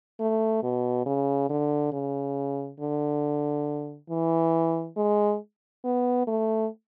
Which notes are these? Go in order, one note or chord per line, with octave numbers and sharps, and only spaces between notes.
A3
B2
C#3
D3
C#3
D3
E3
G#3
B3
A3